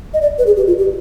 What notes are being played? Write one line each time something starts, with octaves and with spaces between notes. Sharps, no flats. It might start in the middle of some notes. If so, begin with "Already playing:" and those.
D#5
D5
B4
G#4
G4
F4
G4